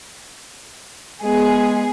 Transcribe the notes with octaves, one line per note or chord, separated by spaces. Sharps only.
G#3 B3 G#4